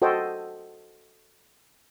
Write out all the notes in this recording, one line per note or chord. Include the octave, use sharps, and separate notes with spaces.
F#4 A4 C5 D#5 G5